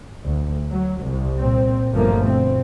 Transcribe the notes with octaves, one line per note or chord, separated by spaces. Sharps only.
D2
F#3
C2
A#2 C4
G1 F#2 F3 A3 A#3
B2 C4